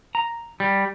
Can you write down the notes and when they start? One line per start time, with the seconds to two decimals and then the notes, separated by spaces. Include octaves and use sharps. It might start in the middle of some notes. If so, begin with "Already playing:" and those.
0.15 A#5
0.60 G3